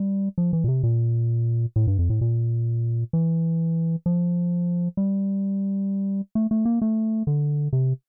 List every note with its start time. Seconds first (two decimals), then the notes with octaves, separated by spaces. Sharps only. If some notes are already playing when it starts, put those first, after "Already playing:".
Already playing: G3
0.38 F3
0.53 E3
0.64 A#2
0.68 C3
0.83 A#2
1.76 A2
1.87 G2
1.99 F2
2.10 A2
2.21 A#2
3.13 E3
4.06 F3
4.97 G3
6.35 A3
6.51 A3
6.65 A#3
6.82 A3
7.27 D3
7.73 C3